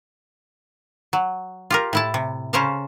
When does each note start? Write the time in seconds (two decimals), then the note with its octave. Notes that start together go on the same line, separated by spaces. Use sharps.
1.13 F#3
1.70 F4 G4 A#4
1.93 A2 E4 A5
2.14 C3
2.53 C#3 C#4 A#4 C5 F5 A5